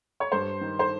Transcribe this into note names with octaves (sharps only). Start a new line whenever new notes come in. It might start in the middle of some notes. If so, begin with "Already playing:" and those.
C#5
G2 C5
D#3
C5